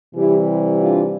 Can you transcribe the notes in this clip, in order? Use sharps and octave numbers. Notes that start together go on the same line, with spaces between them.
C3 E3 G3 E4 G4
D4 F4